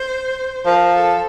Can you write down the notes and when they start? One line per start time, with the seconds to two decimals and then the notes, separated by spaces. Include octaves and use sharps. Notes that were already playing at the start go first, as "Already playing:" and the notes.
Already playing: C5
0.65 F3 A#4
0.95 A4